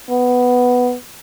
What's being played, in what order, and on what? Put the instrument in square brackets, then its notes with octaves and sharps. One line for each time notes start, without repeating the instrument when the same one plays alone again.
[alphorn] B3